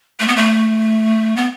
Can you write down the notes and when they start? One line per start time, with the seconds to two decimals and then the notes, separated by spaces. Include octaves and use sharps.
0.20 A3
0.28 B3
0.36 A3
1.36 B3